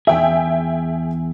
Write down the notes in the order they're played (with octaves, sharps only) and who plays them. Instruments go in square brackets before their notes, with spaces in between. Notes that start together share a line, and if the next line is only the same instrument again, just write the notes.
[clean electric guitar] E2 G#4 [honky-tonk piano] E5 G5 G#5